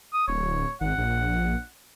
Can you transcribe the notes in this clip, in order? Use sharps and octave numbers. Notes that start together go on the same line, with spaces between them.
D#6
D1 C#5
G#1 F#5
A#1